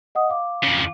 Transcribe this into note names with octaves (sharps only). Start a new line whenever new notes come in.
D#5 F#5 D#6
F5 D6
F2 C#3